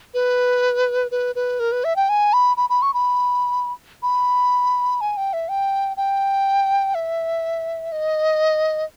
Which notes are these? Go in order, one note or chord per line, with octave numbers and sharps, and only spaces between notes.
B4
B4
B4
A#4
B4
E5
G5
G#5
B5
B5
B5
C#6
B5
B5
G#5
G5
E5
G5
G5
E5
D#5